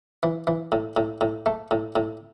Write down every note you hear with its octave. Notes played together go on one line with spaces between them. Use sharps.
E3
E3
A2
A2
A2
A3
A2
A2